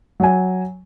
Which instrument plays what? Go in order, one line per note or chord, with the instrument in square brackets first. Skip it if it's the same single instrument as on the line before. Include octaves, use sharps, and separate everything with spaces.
[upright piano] F#3 G#5